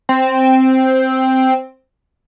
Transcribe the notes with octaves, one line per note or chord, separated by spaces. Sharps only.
C4